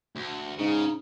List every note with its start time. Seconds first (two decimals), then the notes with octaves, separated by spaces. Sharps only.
0.16 D2
0.59 G#2 C#3 D#4